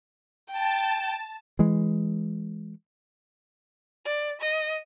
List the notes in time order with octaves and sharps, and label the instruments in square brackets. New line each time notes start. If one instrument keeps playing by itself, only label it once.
[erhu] G5 [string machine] A5
[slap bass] E3 G#3
[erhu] D5
D#5